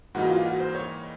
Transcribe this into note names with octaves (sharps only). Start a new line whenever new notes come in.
G#2 E3 G3 A#3 D#4 F#4
F4
F#4
C5
C#5